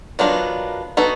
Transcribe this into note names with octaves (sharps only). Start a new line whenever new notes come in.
D#3 F#3 B3 D4 F4
B3 D#4 F#4 A4